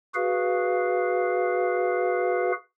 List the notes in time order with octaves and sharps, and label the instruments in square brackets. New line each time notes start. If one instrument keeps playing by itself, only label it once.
[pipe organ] F#4 G#4 B4 F5